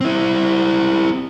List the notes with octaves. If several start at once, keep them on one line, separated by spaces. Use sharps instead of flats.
C4 E4